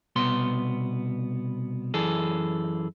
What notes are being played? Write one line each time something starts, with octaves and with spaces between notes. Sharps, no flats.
C2 B2 B3 C6
F#2 E3 G#4 A4